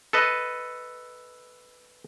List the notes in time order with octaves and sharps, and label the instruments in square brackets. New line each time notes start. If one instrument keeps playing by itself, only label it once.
[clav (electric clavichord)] A4 B4 D#5